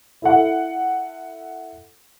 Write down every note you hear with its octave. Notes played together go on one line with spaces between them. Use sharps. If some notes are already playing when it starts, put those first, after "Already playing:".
E4 A4 F#5